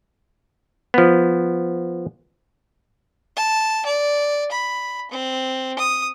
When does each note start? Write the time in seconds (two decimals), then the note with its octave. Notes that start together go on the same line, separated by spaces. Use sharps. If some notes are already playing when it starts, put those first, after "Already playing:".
0.94 F3 B3
3.36 A5
3.86 D5
4.52 B5
5.11 C4
5.79 D#6